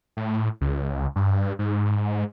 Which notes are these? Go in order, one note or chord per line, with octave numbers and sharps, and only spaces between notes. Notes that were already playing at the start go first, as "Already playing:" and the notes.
A2
C#2
G2
G#2